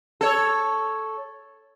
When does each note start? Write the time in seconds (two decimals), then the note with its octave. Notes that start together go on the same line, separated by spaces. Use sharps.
0.21 A4 C#5